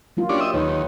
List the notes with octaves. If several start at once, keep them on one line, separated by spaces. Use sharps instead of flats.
F#3 A#3 F4
C#4 D4 G4
D#5 E5
D#2 D#4 B4 C#5